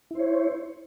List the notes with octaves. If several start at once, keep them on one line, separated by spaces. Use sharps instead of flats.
E4 C5 C#5